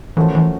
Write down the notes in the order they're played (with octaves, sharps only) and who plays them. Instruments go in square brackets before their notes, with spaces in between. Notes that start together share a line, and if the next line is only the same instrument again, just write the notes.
[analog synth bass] E3 [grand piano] F3 A3 C#4 F#4 A#4
[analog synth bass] E3